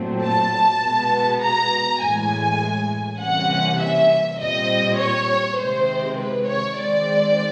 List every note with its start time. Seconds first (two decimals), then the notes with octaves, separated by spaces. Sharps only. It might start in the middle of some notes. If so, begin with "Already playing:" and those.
Already playing: A#2 F#3 A3 C4
0.23 A5
0.83 B2 G#3 B3
1.42 A#5
2.01 A2 E3 G#3 G#5
3.20 C3 E3 G3 A#3 C#4 F#5
3.80 E5
4.39 A#2 G3 C4 D#5
4.99 C#5
5.58 C3 D#3 G#3 C4 C5
6.18 B4
6.47 C#5
6.77 D#3 G#3 C4 D5